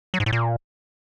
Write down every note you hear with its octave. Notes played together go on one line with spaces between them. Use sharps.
F#3
G#2
A2
A#2